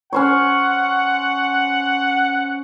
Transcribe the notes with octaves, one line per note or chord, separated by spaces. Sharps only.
C#4 C5 C#5 F#5